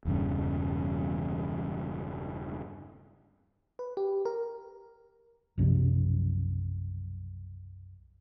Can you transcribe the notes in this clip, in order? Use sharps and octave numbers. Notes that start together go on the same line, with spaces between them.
E1 E2 G2 C#3
B4
G4
A#4
B1 F#2 C3 F3